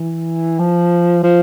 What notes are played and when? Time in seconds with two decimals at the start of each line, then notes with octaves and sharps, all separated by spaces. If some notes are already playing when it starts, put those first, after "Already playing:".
Already playing: E3
0.59 F3
1.23 F3